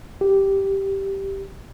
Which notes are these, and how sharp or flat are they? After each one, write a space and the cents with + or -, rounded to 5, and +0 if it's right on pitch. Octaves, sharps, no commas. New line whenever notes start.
G4 -5